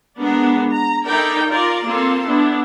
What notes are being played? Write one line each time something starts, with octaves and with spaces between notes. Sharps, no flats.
G#3 B3 D4 A#4
A#5
D#4 E4 A4 A#4 D5 G5
F4 A#4 D5
A#3 C4 F4 A4 C6
B3 D4 E4